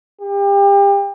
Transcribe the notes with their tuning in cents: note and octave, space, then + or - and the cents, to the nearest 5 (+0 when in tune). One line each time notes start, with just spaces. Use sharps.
G4 +30